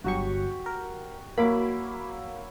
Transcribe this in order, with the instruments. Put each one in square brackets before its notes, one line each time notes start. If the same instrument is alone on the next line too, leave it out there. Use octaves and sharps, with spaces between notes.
[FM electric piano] G1 F#3 C#6 [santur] F#4 G4
[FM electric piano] A#4
[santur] F#3 E4 [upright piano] A#3 [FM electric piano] B5 D6